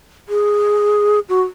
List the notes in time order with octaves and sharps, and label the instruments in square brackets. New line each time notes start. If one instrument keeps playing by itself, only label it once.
[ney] G#4
F#4